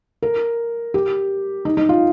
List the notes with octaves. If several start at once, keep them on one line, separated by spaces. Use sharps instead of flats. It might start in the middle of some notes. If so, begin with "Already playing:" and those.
A#4
G4
D#4
D#4
F4